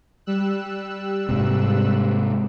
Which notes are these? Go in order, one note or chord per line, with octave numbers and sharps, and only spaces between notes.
G3 E6 F#6
G#2 C3